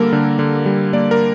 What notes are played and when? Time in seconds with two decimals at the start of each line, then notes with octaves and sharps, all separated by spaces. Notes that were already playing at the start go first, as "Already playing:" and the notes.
Already playing: D3 G3 A#3 A4 A#4
0.13 D3
0.39 D3
0.66 G3
0.93 A#3 D5
1.11 A#4